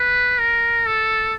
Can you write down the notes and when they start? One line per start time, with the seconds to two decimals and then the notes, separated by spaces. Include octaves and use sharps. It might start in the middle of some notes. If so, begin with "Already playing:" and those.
Already playing: B4
0.39 A#4
0.86 A4